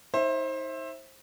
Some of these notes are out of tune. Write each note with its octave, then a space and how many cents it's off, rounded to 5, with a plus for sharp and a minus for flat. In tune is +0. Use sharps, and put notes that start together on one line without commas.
D#4 +35 C5 +25 E5 +0